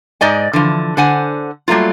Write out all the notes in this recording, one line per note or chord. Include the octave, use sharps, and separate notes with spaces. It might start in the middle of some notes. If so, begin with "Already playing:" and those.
G#2 D5 D#5 G#5
D3 E3 F3
D3 C5 F#5 G#5
F#3 G3 A3 A#3 F4